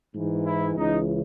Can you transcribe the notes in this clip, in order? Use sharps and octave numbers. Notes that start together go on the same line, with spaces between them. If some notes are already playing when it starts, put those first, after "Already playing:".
G#2 E3
E4
C#2 C#3 E3 D#4